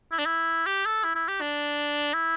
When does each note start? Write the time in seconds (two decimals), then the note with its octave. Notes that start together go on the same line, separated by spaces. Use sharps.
0.12 E4
0.19 D4
0.26 E4
0.66 G4
0.86 A4
1.04 E4
1.15 E4
1.28 G4
1.41 D4
2.14 E4